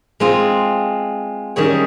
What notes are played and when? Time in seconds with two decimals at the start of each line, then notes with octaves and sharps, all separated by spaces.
0.20 G#3 C4 F4 G#4
1.56 D#3 G3 C#4 G#4 C#5